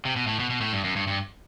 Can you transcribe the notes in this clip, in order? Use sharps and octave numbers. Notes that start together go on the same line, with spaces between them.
C3
B2
A2
B2
B2
A2
G2
F#2
G2
G2